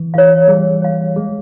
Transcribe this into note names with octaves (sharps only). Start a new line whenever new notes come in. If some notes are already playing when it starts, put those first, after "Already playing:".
Already playing: E3
E3 C#5 F5
G3 G#4
C#5 F5
G#3 G#4